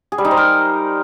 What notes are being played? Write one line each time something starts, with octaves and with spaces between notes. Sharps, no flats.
G#4
G3
D#4
C5
A#4